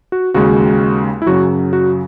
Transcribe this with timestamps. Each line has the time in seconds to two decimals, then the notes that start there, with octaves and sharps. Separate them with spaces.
0.12 F#4
0.34 D#2 C#3 G#3 F#4
1.22 E4
1.26 F#2 C#3 F#3 F#4
1.73 F#4